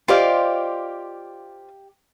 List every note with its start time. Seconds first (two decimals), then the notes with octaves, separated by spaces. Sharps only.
0.08 F4 G4 C5 D5 D#5 F5